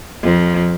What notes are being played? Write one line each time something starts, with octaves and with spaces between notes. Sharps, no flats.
F2